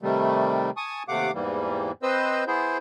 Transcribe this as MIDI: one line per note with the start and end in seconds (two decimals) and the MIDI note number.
0.02 0.70 48
0.02 0.70 51
0.02 0.70 55
0.02 0.70 57
0.77 1.03 80
0.77 1.03 81
0.77 1.03 85
0.77 1.03 87
1.08 1.31 39
1.08 1.31 48
1.08 1.31 57
1.08 1.31 77
1.08 1.31 78
1.08 1.31 86
1.34 1.92 40
1.34 1.92 44
1.34 1.92 52
1.34 1.92 55
1.34 1.92 58
2.03 2.44 60
2.03 2.44 71
2.03 2.44 72
2.03 2.44 75
2.03 2.44 88
2.47 2.78 59
2.47 2.78 64
2.47 2.78 68
2.47 2.78 72